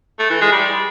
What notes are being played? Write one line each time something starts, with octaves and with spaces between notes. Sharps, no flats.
A3
E3
G#3
G3